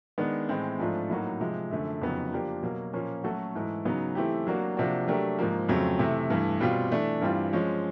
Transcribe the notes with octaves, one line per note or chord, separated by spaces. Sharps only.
D#3 G#3 B3 D4
A2 E3 G#3 C4
G#2 F3 A3 D4 F4
A2 F#3 A#3 D#4 F#4
C3 F3 G#3
F#2 D3 F3 A3
F2 C#3 F#3 B3 D#4
F3 A#3 D4 G4 A#4
B2 F#3 A#3
A#2 F3 A#3 C#4
F#3 A3 C#4 F#4 A4
G#2 E3 A3
C#3 F#3 B3 D#4
E3 A3 C4 E4 G4
F#3 A#3 D4 F#4
C3 F3 A#3 D4 F#4
F#3 A3 D4 G4 A#4
G#2 F3 A#3
F2 C#3 F#3 A3 C4
C3 E3 A3
G2 E3 A3
B2 G3 C4 F4
E3 A3 D4
G2 E3 G3 C4 F4
F3 G#3 C#4